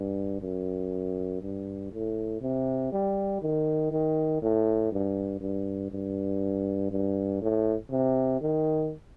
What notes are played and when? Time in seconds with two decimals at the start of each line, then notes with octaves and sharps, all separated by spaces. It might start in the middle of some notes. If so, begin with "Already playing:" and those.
Already playing: G2
0.41 F#2
1.41 G2
1.92 A2
2.41 C3
2.92 G3
3.42 D#3
3.91 D#3
4.42 A2
4.92 G2
5.41 G2
5.91 G2
6.91 G2
7.41 A2
7.91 C3
8.41 D#3